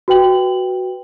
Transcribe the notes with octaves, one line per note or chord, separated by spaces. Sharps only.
F#4 B4 G5 F#7